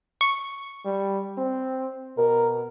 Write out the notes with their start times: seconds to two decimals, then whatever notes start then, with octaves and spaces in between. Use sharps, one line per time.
0.21 C#6
0.85 G3
1.38 C4
2.18 B2 A#4